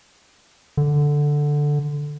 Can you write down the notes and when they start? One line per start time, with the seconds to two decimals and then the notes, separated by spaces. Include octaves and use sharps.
0.77 D3